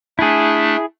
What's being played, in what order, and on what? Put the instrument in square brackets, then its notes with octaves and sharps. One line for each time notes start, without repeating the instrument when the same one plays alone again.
[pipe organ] A3 D4 [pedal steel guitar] E4 G#4